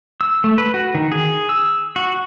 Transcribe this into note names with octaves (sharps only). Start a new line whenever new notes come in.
E6
A3
B4
F#4
D#3
G#4
E6
F#4